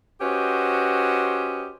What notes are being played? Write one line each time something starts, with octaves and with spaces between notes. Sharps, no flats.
C#4 F#4 G4 B4 C5 D#5